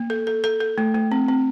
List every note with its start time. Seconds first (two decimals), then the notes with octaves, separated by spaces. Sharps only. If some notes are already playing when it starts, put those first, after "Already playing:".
Already playing: A#3
0.10 A4
0.27 A4
0.44 A4
0.60 A4
0.78 A3
0.95 A3
1.12 C4
1.28 C4